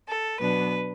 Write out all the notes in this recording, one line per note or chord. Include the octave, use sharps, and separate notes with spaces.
A4
B2 F#3 B3 D4 B4